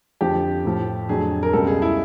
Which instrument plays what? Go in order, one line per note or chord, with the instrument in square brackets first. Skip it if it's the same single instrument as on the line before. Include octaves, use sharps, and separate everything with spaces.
[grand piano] F2 D3 F3 G4
A2 F3
F2 D3 F#3 G#4
A#4
C#2 B2 G3 A4
G#4
E4